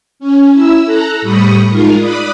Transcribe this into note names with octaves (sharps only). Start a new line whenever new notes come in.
C#4
E4 E6
A4 A#5 F#6
A2 G3 B5 C#6 D#6
G#3 D#4 F4 A#4
D5 B5 D#6 F#6